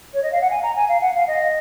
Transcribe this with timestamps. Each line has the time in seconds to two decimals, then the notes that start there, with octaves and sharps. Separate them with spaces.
0.13 C#5
0.22 D#5
0.32 F5
0.41 F#5
0.50 G#5
0.63 A#5
0.76 G#5
0.88 F5
1.01 F#5
1.15 F5
1.27 D#5